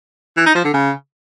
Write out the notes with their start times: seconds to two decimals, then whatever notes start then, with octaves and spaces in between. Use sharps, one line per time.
0.37 E3
0.46 D#4
0.55 F3
0.64 D3
0.74 C#3